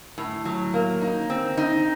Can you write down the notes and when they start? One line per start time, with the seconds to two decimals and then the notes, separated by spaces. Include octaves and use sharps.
0.18 A2
0.45 F#3
0.74 A#3
1.01 D#4
1.30 C4
1.57 D#4